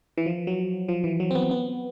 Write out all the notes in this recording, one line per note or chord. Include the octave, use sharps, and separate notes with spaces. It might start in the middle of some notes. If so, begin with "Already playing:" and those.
E3
F3
F#3
F3
E3
F#3
C4
B3
B3